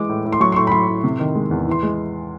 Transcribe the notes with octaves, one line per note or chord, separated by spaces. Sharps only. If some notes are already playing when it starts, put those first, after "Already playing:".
Already playing: E3 G#3 D6
A2
A2
C6
F#3 C#6
C6
A2 C#6
B5
F#3 C6
A2
C3
D#3
G#3
E2
E3 C6
G#3